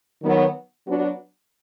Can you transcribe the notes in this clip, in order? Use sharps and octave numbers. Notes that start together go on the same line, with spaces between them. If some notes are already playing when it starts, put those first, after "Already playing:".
D#3 F#3 B3
F#3 B3 D4 F#4